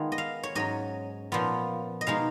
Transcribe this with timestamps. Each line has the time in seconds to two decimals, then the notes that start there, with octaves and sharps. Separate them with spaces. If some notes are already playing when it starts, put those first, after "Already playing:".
Already playing: D#3 G#3 B3 F4
0.12 D#5
0.18 F5
0.43 C#5
0.55 G#2 F#3 C#4 D#5
1.32 A#2 F3 B3 F4
2.01 D#5
2.07 B2 G#3 D#4 F5